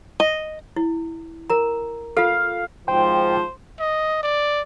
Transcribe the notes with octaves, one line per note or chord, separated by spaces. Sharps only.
D#5
E4
A#4 A#5
F4 A4 F5
G#1 G#2 F3 C5 G5
D#5
D5